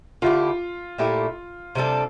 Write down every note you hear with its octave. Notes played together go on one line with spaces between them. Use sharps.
D3 A3 E4 F4 G4
A#2 A3 E4 G4
C3 G3 D4 A4